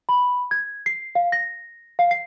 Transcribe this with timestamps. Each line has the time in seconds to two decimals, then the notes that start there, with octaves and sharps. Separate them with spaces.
0.09 B5
0.51 G#6
0.86 C7
1.15 F5
1.32 A#6
1.99 F5
2.11 C7